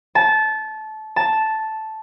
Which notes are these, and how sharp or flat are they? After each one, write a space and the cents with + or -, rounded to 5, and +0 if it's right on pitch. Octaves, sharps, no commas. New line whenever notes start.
A5 -20
A5 -5